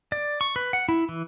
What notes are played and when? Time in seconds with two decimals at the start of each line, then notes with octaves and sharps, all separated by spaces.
0.12 D5
0.41 C#6
0.56 B4
0.73 F#5
0.89 E4
1.09 E3